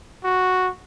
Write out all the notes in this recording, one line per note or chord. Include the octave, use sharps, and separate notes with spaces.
F#4